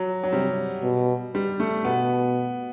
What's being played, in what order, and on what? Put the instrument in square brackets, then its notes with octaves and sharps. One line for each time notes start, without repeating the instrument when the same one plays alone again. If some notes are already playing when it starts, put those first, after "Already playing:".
Already playing: [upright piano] F#3
F#3
[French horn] C3 [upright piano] G3
[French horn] B2
[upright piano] G3
A3
[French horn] B2 [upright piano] B3